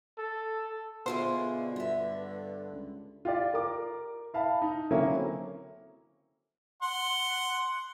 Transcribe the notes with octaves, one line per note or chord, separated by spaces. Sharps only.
A4
B2 D3 E4 F4 G#4 C5
G2 B3 E5
C#2
F4 G4 D5
A#4 D6
E4 F5 A5 B5
D#4
D3 F#3 A#3 C4 C#4 E4
F#5 C6